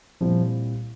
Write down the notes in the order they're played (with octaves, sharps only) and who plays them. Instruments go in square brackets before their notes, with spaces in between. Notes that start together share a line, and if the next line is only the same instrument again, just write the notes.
[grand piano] A#2 G3 C4 E4 [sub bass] F3